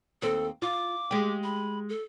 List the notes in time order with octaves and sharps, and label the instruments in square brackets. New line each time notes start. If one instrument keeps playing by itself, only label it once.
[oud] D#2 C4 [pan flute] A4
[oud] F4 [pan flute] D6
[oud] G#3 G4
[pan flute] B5
A4